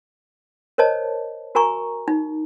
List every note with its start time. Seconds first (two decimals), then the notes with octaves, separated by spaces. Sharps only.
0.78 A#4 C5 C#5 D#5 A5
1.55 F#4 A#4 G#5 A#5 C#6
2.08 D#4